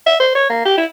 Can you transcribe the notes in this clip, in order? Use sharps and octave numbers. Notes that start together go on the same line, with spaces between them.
E5
C5
C#5
A#3
G4
E4